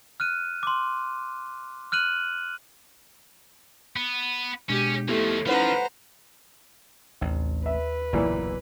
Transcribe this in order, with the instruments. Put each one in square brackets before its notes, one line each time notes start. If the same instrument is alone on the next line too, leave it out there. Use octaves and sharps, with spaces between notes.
[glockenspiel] F6 F#6 D#7
C6 D6
F6 F#6 D#7 F#7
[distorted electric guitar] B3
[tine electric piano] B2 G#3 D4 [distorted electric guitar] C#4 [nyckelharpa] G4
[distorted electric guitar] D#2 F3 [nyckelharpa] A3 [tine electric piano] B3 E4 G4
[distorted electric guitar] F3 [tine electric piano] C#4 D#4 E4 [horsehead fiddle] B4 F#5 [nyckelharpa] C5 A#5
[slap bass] A1 C3 [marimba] D#2
[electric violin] B4 [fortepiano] E5
[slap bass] F#1 B1 [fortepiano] A#2 E3